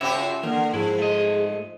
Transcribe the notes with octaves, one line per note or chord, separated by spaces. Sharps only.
C#3 C4 F#4 G4 C#5 E5
F4
D3 E3 A#3 A#4
G#2 F3 E4 G#4
A3 D#5